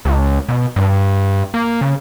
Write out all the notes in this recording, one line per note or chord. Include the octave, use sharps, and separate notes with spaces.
C#2
B2
G2
A#3
C#3